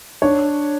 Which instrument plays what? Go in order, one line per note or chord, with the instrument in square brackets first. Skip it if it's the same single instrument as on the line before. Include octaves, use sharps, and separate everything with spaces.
[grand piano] D4 [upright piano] C#5